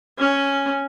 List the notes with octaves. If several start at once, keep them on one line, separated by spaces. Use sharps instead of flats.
C#4